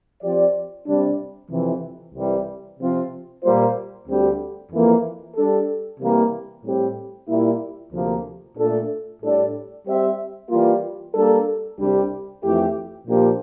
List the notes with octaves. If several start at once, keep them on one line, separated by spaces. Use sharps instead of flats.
F3 C4 G4 D5
C3 G3 D4
F2 C3 E3
C2 C3 E3 G3
C3 F3 C4 F4
A#2 G3 A#3 F4 C5
D2 D3 G3 C4 G4
F2 E3 A#3
G3 D4 A4
C3 E3 G3 A#3
A2 G3 C4 G4
A#2 G3 A#3 E4
D2 C3 F3 A#3
A#2 A3 D4 A4
A2 G3 D4 A4 D5
G3 C4 G4 C5 E5
E3 G3 A#3 F4
G3 A#3 D4 A4
C2 C3 G3 D4 G4
F2 E3 A3 E4 G4
A#2 F3 A#3 D4 G4